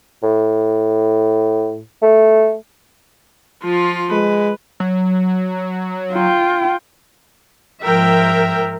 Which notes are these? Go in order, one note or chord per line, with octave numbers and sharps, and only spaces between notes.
A2
A3
F3 F4
G#3 B4
F#3
F4 G5
G#2 F3 A#4 E5 G5